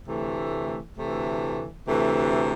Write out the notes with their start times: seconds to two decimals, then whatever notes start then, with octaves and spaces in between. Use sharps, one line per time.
0.07 D2 C3 E3 A3
0.97 D2 C3 E3 A3
1.88 D2 C3 E3 A3